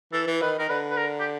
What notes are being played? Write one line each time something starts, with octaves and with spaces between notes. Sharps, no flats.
E3 A4
E3
D#3 B4
D#3 A#4
D3 B4
B4
A#4
G4